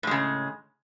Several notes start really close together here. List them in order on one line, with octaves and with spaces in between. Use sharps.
A2 G#3 C#3